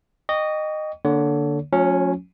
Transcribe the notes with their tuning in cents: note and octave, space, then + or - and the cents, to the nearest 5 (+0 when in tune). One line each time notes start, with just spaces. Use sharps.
D#5 -15 G5 +0 C#6 +35
D3 +0 A#3 +0 C#5 +30
F#3 -45 A3 +0 C#4 +0